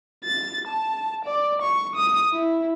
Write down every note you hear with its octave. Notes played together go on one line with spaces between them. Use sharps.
A6
A5
D5
C#6
D#6
E4